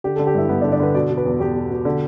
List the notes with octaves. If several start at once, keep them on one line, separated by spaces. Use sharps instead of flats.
D3 G4
D3 A4
G4
G2 E4
G2 B3
D4
D3
D4
D3 B4
B2 D5
B2
B4
E2
E2 G4
B2
B2
D3